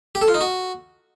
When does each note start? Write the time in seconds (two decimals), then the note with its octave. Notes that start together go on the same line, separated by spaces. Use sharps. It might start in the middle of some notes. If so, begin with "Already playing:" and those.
0.15 G4
0.22 A4
0.28 F4
0.34 D#4
0.41 F#4